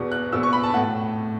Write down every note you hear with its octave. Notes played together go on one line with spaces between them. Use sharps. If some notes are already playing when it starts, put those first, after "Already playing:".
Already playing: E2 B2 B3
F#6
E2 B2 B3 E6
C#6
B5
A5
A2 A3 F#5